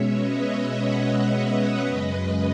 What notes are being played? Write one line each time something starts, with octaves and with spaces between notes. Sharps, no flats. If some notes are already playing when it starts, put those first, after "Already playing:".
Already playing: B2 G#3 C#4 C#5 E5
B4 D#5
C#5 E5
D#5 F#5
D#5 F#5
C#5 E5
F#2 C#3 G#3 B4 D#5